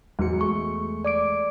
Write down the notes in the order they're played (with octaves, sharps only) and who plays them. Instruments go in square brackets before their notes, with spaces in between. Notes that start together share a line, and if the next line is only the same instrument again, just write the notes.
[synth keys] E2 C#7 [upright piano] G#2 F#3
[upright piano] G#3 A3 [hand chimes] C#6
[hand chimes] D5 D6 D7